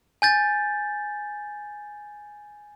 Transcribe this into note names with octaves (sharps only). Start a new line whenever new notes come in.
G#5 G6 A6